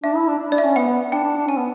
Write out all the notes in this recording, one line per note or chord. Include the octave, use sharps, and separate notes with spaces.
D4 E5
E4
D4
D4
D4 D5
E5
C#4
B3 F#5
B3
D4 G5
D4
D4
C#4 A5
B3